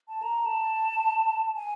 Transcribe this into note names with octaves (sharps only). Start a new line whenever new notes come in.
A5
A#5
A5
G#5